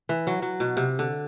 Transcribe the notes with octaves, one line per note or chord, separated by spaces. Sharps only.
E3
F#3
F#3
B2
C3
D3